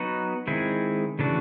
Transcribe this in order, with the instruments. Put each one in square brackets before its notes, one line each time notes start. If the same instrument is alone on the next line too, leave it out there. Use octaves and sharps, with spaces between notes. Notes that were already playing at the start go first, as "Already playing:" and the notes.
Already playing: [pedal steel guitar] F#3 B3 D#4 F#4 B4
D#3 G#3 C4 E4 G#4
C#3 E3 A3 D4 F#4